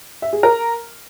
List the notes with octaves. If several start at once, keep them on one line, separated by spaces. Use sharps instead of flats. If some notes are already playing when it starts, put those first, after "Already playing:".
E5
G#4
A#4